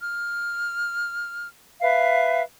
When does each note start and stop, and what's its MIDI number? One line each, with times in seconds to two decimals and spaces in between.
0.01 1.48 89
1.81 2.42 71
1.81 2.42 76
1.81 2.42 77